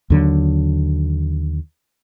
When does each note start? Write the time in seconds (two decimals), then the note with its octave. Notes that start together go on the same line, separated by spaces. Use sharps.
0.10 D#2 D3 F#3